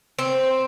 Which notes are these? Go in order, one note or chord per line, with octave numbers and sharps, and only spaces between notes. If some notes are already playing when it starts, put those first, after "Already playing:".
C4